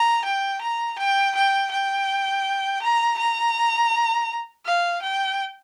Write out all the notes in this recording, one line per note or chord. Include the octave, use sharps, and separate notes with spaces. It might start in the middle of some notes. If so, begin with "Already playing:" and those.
Already playing: A#5
G5
A#5
G5
G5
G5
A#5
A#5
F5
G5